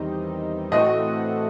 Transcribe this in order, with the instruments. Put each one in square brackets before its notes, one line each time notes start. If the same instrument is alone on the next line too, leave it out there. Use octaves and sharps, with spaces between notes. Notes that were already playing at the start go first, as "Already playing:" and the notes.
Already playing: [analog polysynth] E2 D#3 G3 C4 D#4
[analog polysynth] A2 E3 A3 C4 F#4 [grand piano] D#5